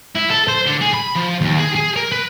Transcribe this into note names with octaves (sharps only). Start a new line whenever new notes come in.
E4
A4
C5
D3
G#4
B5
F3
D#2
G#4
G#4
A#4
B4